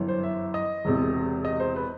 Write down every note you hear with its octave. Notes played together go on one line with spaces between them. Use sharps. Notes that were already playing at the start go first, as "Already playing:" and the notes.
Already playing: G1 F#2 E3
C5
E5
D#5
E1 E2 C3
D#5
C5
B4